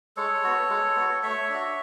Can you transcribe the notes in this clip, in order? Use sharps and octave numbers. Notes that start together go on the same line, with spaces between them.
G#3 A4 C#5
B3 F#4
G#3
B3 F#4
A3 C#5 E5
D4 F#4